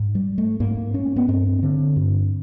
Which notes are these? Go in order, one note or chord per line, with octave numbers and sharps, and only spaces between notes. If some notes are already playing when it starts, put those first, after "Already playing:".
Already playing: G#2
G3
A3
G#2 A#3
C#4
B3
G2 C4
D3
G2